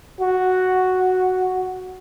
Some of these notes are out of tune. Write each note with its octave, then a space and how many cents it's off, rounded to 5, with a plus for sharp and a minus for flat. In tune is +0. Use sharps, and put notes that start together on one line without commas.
F#4 +0